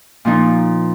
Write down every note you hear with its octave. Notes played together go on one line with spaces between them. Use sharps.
A#2 F3 D#4